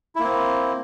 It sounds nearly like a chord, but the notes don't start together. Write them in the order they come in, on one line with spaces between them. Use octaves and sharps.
E4 A#3 C4